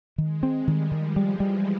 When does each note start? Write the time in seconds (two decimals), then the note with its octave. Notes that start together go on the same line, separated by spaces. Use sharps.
0.18 D#3 G#3
0.43 C4
0.55 G3
0.67 D#3
0.91 D#3 F3
1.16 G3
1.29 E3
1.40 G3